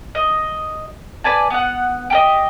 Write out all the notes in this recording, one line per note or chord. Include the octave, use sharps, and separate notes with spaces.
D#5
B4 D5 G#5 A5
B3 F#5
G4 A4 D#5